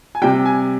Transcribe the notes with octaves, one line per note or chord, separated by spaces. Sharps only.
G#5
C3 G3 G5
G#5